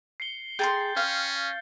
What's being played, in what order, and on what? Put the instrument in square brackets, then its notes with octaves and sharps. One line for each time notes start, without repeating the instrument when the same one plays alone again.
[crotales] C7 C#7 G7
[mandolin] G#4 [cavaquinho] G5 A#5 C6 [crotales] G6 A6
[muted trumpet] C#4 [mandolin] F5